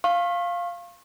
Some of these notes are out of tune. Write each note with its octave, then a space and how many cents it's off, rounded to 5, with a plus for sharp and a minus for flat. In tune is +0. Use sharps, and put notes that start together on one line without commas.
F5 +0 C#6 -40